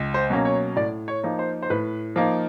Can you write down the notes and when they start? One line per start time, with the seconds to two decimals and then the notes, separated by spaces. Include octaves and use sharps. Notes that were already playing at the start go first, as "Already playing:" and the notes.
Already playing: C#2
0.14 C5
0.30 B2 F#3 A#3 C#4
0.45 C#5
0.76 A2 D5
1.08 C#5
1.23 F3 A#3 D#4
1.39 C5
1.63 C5
1.70 A2 B4
2.16 F3 A#3 D#4